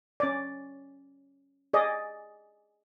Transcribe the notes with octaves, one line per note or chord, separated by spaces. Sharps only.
C#4 D5
G#4 D5 D#5